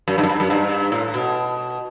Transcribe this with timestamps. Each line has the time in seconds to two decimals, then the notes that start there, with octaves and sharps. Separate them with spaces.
0.08 F#2
0.18 G2
0.23 F#2
0.29 G2
0.40 F#2
0.50 G2
0.92 A2
1.14 B2